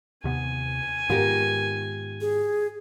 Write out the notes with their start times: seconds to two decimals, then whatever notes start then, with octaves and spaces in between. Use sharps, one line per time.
0.24 D#2 C3 B3 G#5
1.10 G#2 D#3 B3 F4 G4 A#4
2.21 G#4